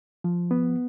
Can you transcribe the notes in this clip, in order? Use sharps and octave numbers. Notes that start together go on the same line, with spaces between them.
F3
B3